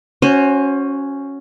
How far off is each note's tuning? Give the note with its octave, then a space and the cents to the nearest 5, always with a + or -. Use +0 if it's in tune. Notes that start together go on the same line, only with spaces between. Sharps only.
C#4 +0 F#4 +0 C5 +25